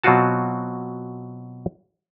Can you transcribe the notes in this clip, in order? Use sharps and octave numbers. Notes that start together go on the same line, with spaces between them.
B2 F#3 C4 F4 F#4 A5